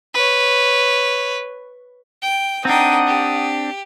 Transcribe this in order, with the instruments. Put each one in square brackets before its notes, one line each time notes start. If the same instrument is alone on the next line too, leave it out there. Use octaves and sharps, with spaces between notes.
[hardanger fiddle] B4 C#5
[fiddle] G5
[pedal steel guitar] C4 D4 [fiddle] D#4 G5 [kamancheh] F#5 D#6
[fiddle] G4